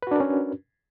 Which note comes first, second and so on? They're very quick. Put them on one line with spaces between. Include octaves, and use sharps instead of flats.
B4 F#4 D4 A#4 C#4